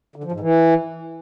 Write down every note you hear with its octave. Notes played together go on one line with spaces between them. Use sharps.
D3
F3
G#2
E3